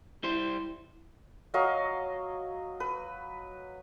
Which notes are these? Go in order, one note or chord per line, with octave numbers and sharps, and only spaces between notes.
G3 E4 C5
F#3 D#5 F5 C#6
B4